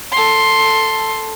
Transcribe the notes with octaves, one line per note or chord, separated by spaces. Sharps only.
A4 C6